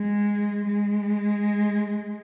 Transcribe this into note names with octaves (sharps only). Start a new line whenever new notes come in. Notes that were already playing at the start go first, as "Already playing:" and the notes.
Already playing: G#3
G#3